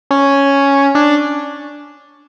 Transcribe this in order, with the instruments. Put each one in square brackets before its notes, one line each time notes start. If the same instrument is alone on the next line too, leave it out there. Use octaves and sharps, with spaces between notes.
[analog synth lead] C#4
D4